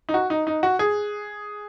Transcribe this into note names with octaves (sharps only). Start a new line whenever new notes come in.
D#4
F#4
D#4
D#4
F#4
G#4